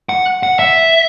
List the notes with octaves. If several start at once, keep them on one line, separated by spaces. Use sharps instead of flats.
F#5
F#5
E5